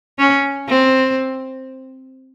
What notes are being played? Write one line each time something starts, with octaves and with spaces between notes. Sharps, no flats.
C#4
C4